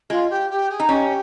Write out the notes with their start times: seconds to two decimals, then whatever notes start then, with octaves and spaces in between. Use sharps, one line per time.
0.10 G#3 F4
0.30 G4
0.50 G4
0.70 G#4
0.80 D#4
0.89 C#4 G4